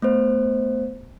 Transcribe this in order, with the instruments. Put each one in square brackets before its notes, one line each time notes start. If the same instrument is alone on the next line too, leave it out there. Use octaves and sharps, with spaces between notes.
[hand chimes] A3 B3 C5